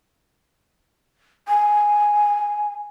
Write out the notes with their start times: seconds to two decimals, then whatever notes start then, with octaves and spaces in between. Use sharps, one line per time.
1.48 G#5